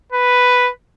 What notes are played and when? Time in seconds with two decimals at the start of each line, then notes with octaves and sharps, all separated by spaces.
0.12 B4